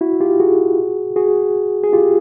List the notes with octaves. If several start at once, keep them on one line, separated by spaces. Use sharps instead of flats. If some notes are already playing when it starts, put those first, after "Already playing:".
E4 F#4
F4 G4
F#4 G#4
F#4 G#4
G#4
F4 G4